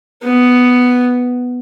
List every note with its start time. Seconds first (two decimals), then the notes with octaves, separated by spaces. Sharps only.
0.23 B3